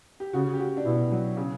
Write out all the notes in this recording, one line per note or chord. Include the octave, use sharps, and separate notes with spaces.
G4
C#3 F#4
G4
F#4
D4
B2 E4
F#3
C#3